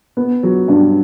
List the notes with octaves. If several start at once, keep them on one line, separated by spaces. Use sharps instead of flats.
B3
F#3
G2